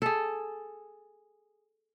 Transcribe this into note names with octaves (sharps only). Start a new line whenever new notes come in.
G#4 A4